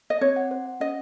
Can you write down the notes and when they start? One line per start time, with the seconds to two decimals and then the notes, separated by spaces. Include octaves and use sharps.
0.10 D#5
0.21 C4 C#5
0.36 F#5
0.51 C5
0.66 F#5
0.80 C#4 D#5